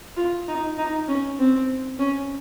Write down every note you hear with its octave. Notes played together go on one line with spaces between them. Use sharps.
F4
D#4
D#4
C#4
C4
C#4